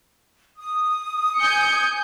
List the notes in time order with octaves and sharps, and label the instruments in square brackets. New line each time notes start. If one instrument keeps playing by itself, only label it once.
[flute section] D#6
[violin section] G#5 G6 C#7